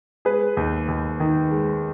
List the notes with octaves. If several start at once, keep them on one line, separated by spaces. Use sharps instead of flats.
G#3 G#4 B4
D#2
D#2
D#3
G#3